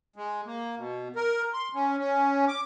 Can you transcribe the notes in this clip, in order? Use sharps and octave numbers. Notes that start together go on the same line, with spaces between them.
G#3
A#3
B2
A#4
C6
C#4
C#4
D6